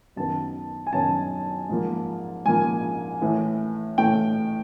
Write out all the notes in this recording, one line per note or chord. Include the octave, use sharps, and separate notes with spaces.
F#2 D#3 F#3 B3 A5
G#5
F#2 D#3 F#3 B3 A5
G#2 F3 A#3
G#2 F3 A#3 G#5
A2 E3 A3
A2 E3 A3 G5